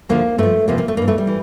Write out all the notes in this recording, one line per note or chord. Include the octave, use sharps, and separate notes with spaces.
D2 D3 F3 A#3
G2 F3 A3
E2 C3 F3 A#3
A#3
A3
G2 E3 A#3
A3
G3
E3